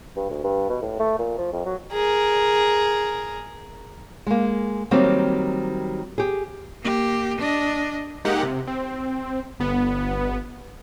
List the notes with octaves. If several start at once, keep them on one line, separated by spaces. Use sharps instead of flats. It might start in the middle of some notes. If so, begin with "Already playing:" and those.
G2
D2
G2
B2
A2
A3
A#2
F3
F2
F#3
G#4 A#4
G#3 A#3
D#3 F#3 G3 A#3 C4
G4 G#4
A#3 G4
D4 D#5
G#3 A#3 D#4 G4 F#5
C3
C4
G1 B3